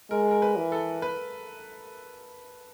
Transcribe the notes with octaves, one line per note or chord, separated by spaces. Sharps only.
G#3 A#4
A#4
B4
E3
A4
B4